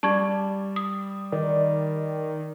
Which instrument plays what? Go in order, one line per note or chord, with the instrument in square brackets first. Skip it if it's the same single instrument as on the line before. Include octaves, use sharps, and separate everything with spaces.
[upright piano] G3 [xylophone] A5 C#6 G#6
[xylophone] D#6
[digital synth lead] D#3 [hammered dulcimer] D5